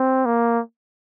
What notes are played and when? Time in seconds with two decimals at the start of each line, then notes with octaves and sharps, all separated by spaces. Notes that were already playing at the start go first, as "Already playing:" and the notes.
Already playing: C4
0.26 A#3